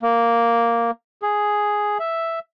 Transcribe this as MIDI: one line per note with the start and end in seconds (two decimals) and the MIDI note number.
0.03 0.91 58
1.22 1.98 68
1.99 2.39 76